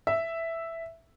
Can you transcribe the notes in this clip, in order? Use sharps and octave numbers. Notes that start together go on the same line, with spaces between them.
E5